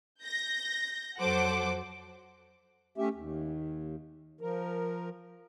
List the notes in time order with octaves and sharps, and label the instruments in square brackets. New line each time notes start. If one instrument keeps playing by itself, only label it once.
[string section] G6 A#6
F2 F#3 A4 C5 F#5 D6
[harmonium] A3 C#4 G4 E5
D#2
F3 A#4